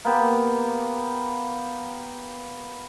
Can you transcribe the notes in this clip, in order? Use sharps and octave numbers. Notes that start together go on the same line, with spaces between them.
A#3 B3 G4